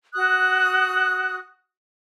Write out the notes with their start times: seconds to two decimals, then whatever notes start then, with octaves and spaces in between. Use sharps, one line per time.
0.14 F#4 D#6 F#6